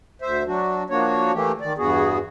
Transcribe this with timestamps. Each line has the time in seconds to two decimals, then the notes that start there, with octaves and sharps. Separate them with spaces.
0.22 D2 C5 E5
0.47 F#3 D4 F#4
0.90 F3 A#3 D4 F#4 C#5
1.34 E3 A3 A#3 G4
1.61 D#3 D5
1.78 E2 G2 B3 F#4 G#4